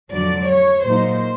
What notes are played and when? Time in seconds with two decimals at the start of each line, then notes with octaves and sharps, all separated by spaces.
0.11 F2 D3 F#3 D5
0.48 C#5
0.84 A#2 F#3 A#3 D#4 C5